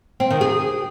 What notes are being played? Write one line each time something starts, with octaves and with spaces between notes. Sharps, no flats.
C4
D#3
G#4